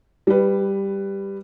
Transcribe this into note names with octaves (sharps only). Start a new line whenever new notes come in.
G3 B4